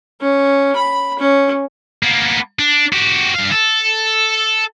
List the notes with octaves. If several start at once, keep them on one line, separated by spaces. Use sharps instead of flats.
C#4
B5
C#4
A#3 B3
D4
F#4 G4
G2 F5
A4